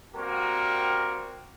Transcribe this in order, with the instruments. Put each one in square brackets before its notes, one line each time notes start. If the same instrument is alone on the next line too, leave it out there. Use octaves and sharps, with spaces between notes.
[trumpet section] G3 A#3 C4 F#4 A#4